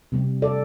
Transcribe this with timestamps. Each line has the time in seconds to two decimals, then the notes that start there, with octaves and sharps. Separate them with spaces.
0.12 C3 G3 C4
0.42 A4 D5